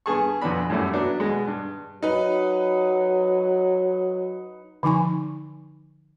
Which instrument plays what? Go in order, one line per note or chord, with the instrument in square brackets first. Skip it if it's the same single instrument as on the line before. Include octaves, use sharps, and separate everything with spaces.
[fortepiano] G2 B3 G#4 A5 C#6
F2 B2 E3 B3 D4 B5
F#2 A2 G3 A3 E4
F#3 B3 D4 F#4
B2 G#3
G2
[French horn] F#3 [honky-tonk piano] D#4 B4
[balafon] D3 F3 D#4 G#5 C#6